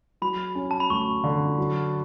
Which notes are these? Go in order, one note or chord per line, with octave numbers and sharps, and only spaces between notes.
F#3 B5
C#4
A5
B5
D2 C#6
D3
F#3